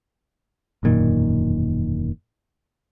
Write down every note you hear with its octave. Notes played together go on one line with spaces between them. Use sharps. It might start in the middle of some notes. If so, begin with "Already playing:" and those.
E1 F#2 A#2 D#3